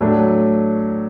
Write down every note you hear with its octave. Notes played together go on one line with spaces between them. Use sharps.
A2 F#3 A3 D4